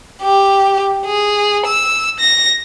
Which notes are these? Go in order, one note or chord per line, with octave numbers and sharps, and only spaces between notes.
G4
G#4
E6
A#6